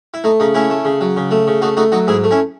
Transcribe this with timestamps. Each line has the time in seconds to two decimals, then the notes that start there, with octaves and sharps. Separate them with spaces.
0.14 E4
0.24 A3 D#4
0.40 C#3 D#4
0.54 A3 C#4 E4
0.70 A3
0.85 C#3
1.01 F#3
1.16 C#3
1.31 A3
1.47 C#3
1.62 A3 D#4 F#4
1.77 A3 D#4 F#4
1.92 F#3 D#4 F#4
2.07 G#2 E4 G#4
2.24 A3
2.31 C#4 E4